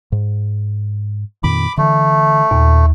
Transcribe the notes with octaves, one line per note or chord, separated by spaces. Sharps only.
G#2
F2 A#2 D#3 B5 D6
D3 E3 A3
D#2 A#2